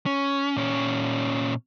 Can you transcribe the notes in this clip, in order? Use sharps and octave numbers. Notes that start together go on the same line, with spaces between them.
C#4
A#2 C#4